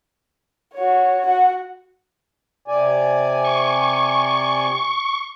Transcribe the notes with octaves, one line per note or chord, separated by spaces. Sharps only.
F#4 C#5
F#4 F#5
C3 D5 G#5
C#6